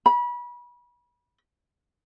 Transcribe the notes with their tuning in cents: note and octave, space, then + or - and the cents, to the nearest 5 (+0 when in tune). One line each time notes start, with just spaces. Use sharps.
B5 -30